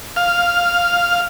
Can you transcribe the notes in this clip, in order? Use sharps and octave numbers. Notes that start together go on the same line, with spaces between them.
F5